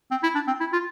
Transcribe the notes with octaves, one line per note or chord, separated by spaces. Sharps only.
C4
E4
D4
C4
E4
F4